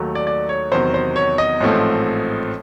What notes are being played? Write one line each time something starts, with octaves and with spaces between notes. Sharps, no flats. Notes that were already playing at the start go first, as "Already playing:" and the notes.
Already playing: D#2 D#3 F#3 A3
D5
D5
C#5
E2 C3 D#3 F#3 C5
C5
C#5
D#5
A1 G#2 F3 A3 C4